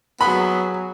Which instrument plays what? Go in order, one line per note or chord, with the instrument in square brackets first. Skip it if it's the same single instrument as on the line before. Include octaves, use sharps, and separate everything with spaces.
[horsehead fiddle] F#3 G#4 [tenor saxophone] B3 [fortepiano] B5